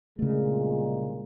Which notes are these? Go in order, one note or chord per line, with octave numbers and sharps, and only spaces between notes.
C2 A#2 C#3 G#3 A3